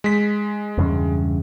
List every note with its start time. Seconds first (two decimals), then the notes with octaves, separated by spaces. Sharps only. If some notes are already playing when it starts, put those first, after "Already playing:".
0.04 G#3 B6
0.78 E2 G2 C#3